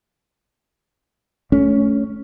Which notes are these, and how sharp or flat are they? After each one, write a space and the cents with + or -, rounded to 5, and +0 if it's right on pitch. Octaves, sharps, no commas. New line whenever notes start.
A3 -15 C#4 +10